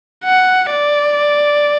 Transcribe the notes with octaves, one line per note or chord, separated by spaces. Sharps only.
F#5
D5